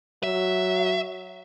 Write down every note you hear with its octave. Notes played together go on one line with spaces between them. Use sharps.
F#3 E5